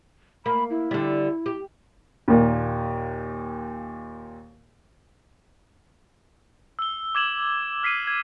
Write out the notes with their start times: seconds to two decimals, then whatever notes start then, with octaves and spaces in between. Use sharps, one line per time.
0.46 A#3 B5
0.70 E4
0.91 D3 G3
1.46 G4
2.28 D#2 A#2
6.79 E6 G7
7.15 D6 G#6 E7 F#7
7.83 F6 B6 C7 D#7
8.07 G#6